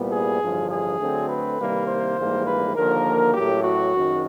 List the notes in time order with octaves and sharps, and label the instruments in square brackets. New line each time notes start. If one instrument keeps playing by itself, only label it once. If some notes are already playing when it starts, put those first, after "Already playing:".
Already playing: [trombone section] C2 A#2 G3 B3
G#4
A1 G2 D3 F3
G#4
D2 D3 F#3 A3 C4
B4
C2 C3 D#3 G3 A#3
C5
A#1 G#2 E3 G3 A#3
B4
D#2 D3 F3 A#3 A#4
A1 A2 F#3 G4
F#4
G#1 F#2 D#3